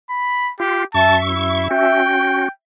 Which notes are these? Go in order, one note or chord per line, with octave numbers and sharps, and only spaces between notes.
B5
F4 G4
F#2 E5 A5 C#6
E4
C#4 F#4 G5